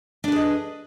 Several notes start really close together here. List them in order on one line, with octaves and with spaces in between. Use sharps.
D4 B4 G#4 D#5